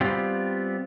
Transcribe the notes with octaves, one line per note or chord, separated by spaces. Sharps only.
G3 B3 C4 F4 G4